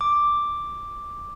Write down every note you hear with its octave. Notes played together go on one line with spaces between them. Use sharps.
D6